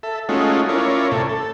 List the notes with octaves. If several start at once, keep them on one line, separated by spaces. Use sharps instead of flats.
A4 E5
G#3 A3 C#4 D#4 F4 F#4
C#4 E4 F4 A#4 C#5 D5
A2 C3 A4 C#5
A4